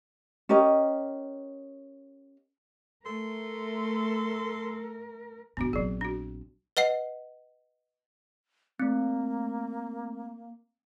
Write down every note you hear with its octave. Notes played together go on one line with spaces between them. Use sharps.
C#4 G4 A#4 D#5
A3 A4 A#4 C6
G#2 D#3 B3 D4 F#4
A#1 F#3 C4 G#4
D4 F#4
B4 D#5 F#5 C7
A3 A#3 C4